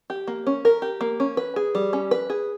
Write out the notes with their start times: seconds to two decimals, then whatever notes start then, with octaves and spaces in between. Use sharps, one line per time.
0.10 G4
0.27 A#3
0.47 C#4
0.65 A#4
0.82 G4
1.01 A#3
1.20 C#4
1.37 B4
1.56 G#4
1.75 G3
1.93 C#4
2.11 B4
2.30 G#4